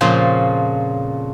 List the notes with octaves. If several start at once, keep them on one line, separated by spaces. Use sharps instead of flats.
F2 A#2 C#3 F4 C5